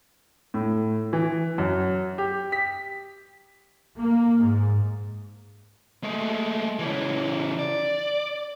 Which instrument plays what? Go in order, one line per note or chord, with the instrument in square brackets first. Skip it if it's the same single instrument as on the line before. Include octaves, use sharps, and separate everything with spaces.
[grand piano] A2
E3
F#2
G4
B6
[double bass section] A#3
G#2
[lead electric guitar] G#3 A3
C#3 E3
D5